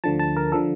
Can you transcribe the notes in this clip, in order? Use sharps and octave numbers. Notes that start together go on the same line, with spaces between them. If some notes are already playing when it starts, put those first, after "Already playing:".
D2 D3 F3 A5
A5
A#4
D3 F3 A4